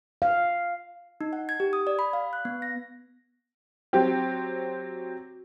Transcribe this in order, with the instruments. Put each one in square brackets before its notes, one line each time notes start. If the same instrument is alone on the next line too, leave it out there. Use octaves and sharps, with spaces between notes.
[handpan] F5
[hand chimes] D#4
F#5
G#6
G4
D#6
D5
B5
F5
F#6
B3
A#6
[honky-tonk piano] F#3 C4 G4